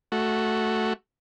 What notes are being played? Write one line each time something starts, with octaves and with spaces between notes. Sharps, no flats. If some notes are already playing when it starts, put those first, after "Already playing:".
A3 F#4